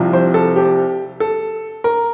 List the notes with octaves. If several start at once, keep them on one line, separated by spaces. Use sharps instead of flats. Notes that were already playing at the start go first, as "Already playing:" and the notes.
Already playing: C2 C3 F3
C5
A4
G4
A4
A#4